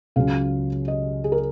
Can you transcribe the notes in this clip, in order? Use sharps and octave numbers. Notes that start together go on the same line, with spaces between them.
C#2 C#3 F#3 C#4 F5
D#5
G#4
A#4